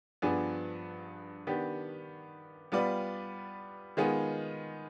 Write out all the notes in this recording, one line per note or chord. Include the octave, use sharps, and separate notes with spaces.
G2 F3 B3 D4 G#4
D#3 B3 D4 G4
G3 B3 F4 B4 D5
D#3 G#3 B3 F4 G#4